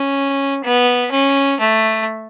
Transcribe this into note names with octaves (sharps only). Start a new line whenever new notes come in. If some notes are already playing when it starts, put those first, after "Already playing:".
Already playing: C#4
B3
C#4
A3